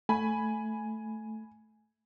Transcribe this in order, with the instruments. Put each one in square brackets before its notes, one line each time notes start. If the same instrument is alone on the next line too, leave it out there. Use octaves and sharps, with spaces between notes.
[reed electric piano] A3 [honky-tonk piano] G#5 B5